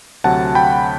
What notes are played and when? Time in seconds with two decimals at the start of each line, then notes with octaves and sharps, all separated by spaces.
0.24 D2 C3 F#3 F#5 A5
0.55 G5 B5